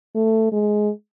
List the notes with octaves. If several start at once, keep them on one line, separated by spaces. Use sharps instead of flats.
A3
G#3